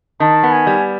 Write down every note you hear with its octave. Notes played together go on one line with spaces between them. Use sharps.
D#3 A5
B3
G#5
G3